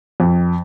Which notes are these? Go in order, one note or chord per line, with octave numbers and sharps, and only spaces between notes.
F2